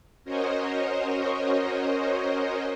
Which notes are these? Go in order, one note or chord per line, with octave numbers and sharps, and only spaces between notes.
C#4 F#4 A#4 C5 C#5 D#5